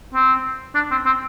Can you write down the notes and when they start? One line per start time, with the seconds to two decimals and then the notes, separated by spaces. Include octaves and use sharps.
0.15 C4
0.75 D4
0.91 C4
1.06 C4